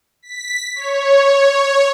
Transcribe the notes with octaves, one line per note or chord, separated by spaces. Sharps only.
B6
C#5